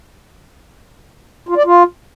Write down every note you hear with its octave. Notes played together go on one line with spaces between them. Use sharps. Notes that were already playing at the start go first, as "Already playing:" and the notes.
F4
D5
F4